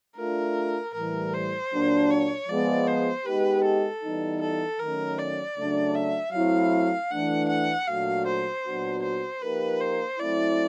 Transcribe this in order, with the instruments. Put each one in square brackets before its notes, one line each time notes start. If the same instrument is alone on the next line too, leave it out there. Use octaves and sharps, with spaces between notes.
[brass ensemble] A3 D4 F4 [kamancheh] A#4
[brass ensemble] A2 E3 G3 [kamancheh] A#4
[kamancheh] C5
[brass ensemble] A#2 F#3 A#3 D4
[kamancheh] C#5
[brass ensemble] F3 G#3 B3 [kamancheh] D5
[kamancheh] C5
[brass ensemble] G#3 B3 D#4 G4 [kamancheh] B4
[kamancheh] A4
[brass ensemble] E3 G3 B3 D#4
[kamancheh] A4
[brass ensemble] D#3 F#3 A3 C#4 [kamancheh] A#4
[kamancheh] D5
[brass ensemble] C#3 F#3 A3 D4
[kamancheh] E5
[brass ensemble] F#3 A3 C4 E4 [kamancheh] F5
[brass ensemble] E3 A3 D4 [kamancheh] F#5
[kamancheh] F#5
[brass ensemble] A#2 F#3 A3 D4 F#4 [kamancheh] F5
[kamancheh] C5
[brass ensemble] A#2 F#3 B3 D4 F#4
[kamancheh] C5
[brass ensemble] F3 A#3 D#4 G4 A#4 [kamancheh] B4
[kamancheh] C5
[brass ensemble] F#3 A3 C4 E4 [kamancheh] D5